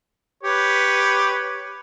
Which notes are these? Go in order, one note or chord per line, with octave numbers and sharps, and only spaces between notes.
G4 B4 C#5